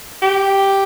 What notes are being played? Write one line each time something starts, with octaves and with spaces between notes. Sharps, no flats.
G4